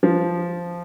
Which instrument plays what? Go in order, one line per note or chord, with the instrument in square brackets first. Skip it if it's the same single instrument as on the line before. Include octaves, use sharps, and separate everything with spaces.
[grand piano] F3